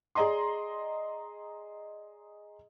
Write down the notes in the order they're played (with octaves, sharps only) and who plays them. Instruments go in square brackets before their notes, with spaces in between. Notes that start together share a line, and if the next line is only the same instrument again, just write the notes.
[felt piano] G#4 D5 D#5 A#5 C6